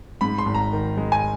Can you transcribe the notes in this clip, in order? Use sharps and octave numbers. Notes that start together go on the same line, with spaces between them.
G#2 B5
C6
G#1
A#5
D#3
G#3
G#5